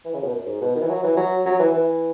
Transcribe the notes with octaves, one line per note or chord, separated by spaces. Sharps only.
E3
C#3
B2
F#2
G#2
B2
D#3
E3
F#3
E3
F#3
F#3
E3
E3